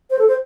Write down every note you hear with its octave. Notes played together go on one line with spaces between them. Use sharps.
C5
A4
C5